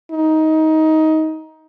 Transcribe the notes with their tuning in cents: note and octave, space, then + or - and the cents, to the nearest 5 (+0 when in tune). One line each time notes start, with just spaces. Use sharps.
D#4 +20